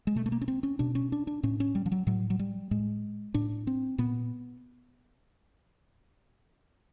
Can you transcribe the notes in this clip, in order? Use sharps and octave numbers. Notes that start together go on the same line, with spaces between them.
G#3
B2 A3
A3
A#3
C#4
C4
C#4
B2 D4
C#4
D4
D4
A2 C#4
C#4
G3
F3
F#3
A2 F#3
F#3
G3
A2 G#3
A2 D4
C4
A#2 B3